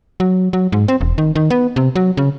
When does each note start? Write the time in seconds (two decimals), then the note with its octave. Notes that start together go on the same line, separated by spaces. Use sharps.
0.20 F#3
0.53 F#3
0.72 G#2
0.88 C4
1.01 E1
1.18 D#3
1.35 D#3
1.50 B3
1.76 C3
1.96 F#3
2.17 C#3